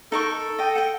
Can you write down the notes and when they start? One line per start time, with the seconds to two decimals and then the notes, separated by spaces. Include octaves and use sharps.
0.12 D#4 A4 A#4 C#6
0.59 D#5 G5
0.75 F#5 G5